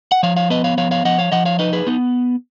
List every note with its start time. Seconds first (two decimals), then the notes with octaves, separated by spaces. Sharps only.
0.12 F#5
0.23 F3 C#5 F5
0.37 C#5 F5
0.50 B3 B4 D#5
0.64 C#5 F5
0.78 F3 C#5 F5
0.91 C#5 F5
1.05 F3 D#5 F#5
1.18 C#5 F5
1.32 F3 D#5 F#5
1.45 C#5 F5
1.59 D#4 B4 D#5
1.73 G#4 B4
1.87 B3 D#4